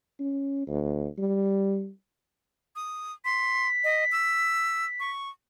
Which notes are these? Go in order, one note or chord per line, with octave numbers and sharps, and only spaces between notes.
C#4
D2
G3
D#6
C6 B6
D#5
E6
C#6